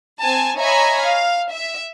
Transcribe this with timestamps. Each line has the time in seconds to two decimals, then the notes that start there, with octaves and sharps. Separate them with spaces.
0.21 C4 G#5 A5
0.58 C#5 D#5 E5 G#5 A#5 B5
1.00 F5
1.52 E5